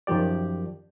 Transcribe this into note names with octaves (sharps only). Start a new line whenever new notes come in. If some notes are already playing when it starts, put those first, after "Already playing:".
F#2 D#3 F3 G4 D5